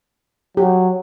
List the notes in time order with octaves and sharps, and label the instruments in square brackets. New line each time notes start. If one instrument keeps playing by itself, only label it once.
[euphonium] F#3 [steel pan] G4